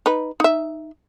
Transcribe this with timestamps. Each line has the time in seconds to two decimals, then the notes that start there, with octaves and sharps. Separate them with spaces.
0.06 D#4 B4
0.40 D#4 E5